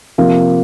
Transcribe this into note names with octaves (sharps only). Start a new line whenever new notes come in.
C3 F3 A#3